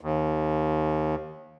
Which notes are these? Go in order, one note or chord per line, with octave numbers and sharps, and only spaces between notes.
D#2